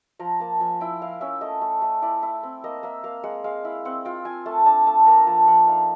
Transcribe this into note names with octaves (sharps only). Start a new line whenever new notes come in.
F3 A#5
A#3 A5
F3 G#5
E4 G5
E4 F5
C#4 E5
A3 D#5
A3
A3
E4 D5
E4
C4
A#3 D#5
A#3 E5
A#3 F5
G#3 F#5
G#3 F5
E4
C4 F#5
F4 G5
F4 G#5
A3 A5
D4 A5
A3 A5
A#3 A#5
F3 A5
F3 F#5
D#4 F5